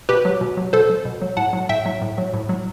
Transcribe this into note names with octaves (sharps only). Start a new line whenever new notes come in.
B2 G4 B4
F#3
B2
F#3
B2 A4 C5
F#3
B2
F#3
A2 F#5 A5
F#3
A2 E5 G5
F#3
A2
F#3
A2
F#3